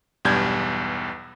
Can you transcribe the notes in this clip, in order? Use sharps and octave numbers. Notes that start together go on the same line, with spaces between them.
B1 E2 G2 G3 G6 G#6